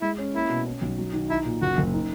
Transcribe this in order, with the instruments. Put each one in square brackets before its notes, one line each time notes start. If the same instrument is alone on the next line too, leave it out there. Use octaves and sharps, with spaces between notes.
[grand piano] G#3 [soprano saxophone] E4
[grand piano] C#4
[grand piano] A#3 [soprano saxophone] E4
[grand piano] B2
C#4
B1
F#3
D#3
[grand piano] D#4 [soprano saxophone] E4
[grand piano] A#2
[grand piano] F#1 [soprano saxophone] F#4
[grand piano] F#1
D#4